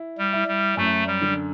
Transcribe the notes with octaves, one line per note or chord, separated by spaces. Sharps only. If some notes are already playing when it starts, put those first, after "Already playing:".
Already playing: E4
G3
E4
G3
F#2 A3
G3
D3